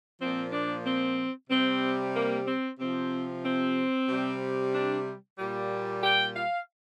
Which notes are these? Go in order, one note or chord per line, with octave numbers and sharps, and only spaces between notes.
A#2 F3 C4
D4
C4
C3 G3 C4
A#3
C4
C3 F3 C4
C4
C3 G3
D4
A#2 G3
G5
F5